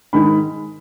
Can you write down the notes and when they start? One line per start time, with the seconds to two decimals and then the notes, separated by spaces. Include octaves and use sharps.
0.13 G#2 D#3 G#3 B5